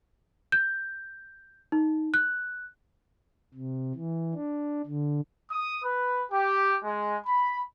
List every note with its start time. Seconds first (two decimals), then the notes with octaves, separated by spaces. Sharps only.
0.52 G6
1.72 D#4
2.14 F#6
3.54 C3
3.95 E3
4.34 D4
4.86 D3
5.51 D#6
5.83 B4
6.32 G4
6.82 G#3
7.27 B5